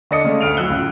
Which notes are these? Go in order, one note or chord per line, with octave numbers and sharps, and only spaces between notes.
D3 D4 D5 D#5 D#6 C#7
C#3 G#3 A3
D2 F5 F6 D7 D#7 F7
A2 F#3 E6 F#6 G7
C#2